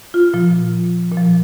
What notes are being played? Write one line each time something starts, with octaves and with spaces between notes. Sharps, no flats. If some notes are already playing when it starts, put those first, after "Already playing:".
F4
A#2 F3
A#2 F3